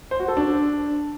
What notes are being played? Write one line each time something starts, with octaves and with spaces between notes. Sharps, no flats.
C5
F#4
A4
D4